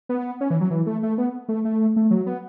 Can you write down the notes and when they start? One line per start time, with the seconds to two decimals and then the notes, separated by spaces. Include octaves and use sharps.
0.09 B3
0.41 C#4
0.50 E3
0.61 F#3
0.71 E3
0.87 A3
1.03 A3
1.18 B3
1.49 A3
1.65 A3
1.96 A3
2.11 F#3
2.27 B3